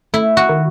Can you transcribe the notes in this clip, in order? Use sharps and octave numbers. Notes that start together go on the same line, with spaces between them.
A3 E4
F#4
D#3